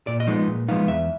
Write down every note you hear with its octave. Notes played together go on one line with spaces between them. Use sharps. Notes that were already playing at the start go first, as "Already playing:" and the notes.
A#2 D5
D#5
F3 G#3 B3 D#4
A#2
F3 G#3 B3 D#4 F5
E2 E5